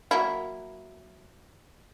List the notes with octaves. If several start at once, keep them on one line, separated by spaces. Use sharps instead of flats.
F#3 A#3 E4